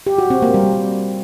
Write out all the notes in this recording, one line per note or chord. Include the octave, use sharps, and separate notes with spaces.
G4
F#4
C4
A#3
G3